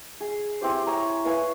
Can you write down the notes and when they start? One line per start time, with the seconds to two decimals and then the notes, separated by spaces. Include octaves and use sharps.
0.21 G#4
0.61 C4 E4 G4 C5
0.87 C#5 G#5 A#5
1.25 E4 B4 F5 G#5